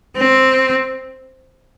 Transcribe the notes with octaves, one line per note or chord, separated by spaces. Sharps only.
C4